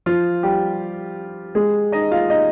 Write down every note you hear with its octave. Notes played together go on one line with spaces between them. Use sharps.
F3 F4
G3 G4
G#3 G#4
D#4 D#5
F4 F5
D#4 D#5